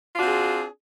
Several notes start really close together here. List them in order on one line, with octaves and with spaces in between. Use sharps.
F4 D4 F#4 C4 G#4